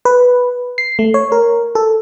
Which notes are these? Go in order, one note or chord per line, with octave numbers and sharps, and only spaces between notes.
B4
C7
A3
C#5
A#4
A4